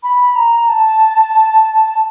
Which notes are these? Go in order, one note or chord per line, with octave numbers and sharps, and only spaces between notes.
B5
A#5
A5